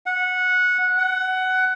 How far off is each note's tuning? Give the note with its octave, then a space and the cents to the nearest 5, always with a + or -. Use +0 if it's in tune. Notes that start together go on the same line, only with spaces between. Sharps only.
F#5 -15
F#5 +15